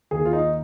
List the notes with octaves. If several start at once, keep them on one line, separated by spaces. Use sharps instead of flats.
D#2 D#3 A#3 G#4
F4
D#4